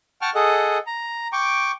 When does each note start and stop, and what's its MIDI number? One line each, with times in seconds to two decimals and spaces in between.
0.22 0.30 78
0.22 0.30 79
0.22 0.30 81
0.22 0.30 85
0.22 0.30 89
0.35 0.78 68
0.35 0.78 69
0.35 0.78 75
0.35 0.78 78
0.87 1.28 82
1.33 1.72 79
1.33 1.72 85
1.33 1.72 86